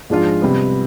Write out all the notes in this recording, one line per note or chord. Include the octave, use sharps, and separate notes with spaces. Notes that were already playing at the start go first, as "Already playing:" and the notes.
G#2 F3 G#3 D4 F4
C3 G3 B3